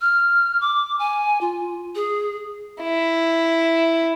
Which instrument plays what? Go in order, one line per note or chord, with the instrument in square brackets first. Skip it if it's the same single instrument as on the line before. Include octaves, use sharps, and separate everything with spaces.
[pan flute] F6
D6
G#5
F4
G#4
[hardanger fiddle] E4